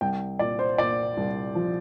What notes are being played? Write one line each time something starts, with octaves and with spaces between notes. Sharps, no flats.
C2 G5
A#2 D5
C5
A#2 D5
C2
F3